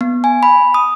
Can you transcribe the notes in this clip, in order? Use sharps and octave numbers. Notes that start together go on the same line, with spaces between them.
B3
G#5
B5
D#6